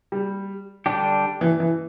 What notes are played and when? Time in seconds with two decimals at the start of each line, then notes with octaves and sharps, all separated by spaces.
0.12 G3
0.86 D3 G3 D4 G4
1.41 E3
1.60 E3